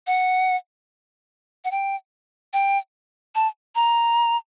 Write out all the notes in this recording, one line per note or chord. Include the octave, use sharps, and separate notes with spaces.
F#5
F#5
G5
G5
A5
A#5